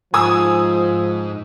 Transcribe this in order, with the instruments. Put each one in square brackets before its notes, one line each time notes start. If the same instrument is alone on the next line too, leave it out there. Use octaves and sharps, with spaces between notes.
[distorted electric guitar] G#2 [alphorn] F3 [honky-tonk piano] G#5 D#6 E6